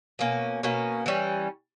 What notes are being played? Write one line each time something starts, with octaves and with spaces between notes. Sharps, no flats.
B2 A#3 C#4
B2 A#3 C#4
E3 G3 C#4